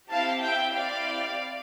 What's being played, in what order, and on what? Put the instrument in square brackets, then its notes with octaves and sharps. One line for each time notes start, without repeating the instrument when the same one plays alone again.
[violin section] C4 E4 G4 F5 A5
E5 G5
C4 E4 G4 D5 F5